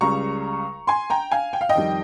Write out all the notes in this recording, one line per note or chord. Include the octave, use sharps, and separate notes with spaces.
C#2 C#3 G3 A#5 C#6
G#5 C6
G5 A#5
F5 G#5
G5
F5
D#5 G5
F2 D#3 G3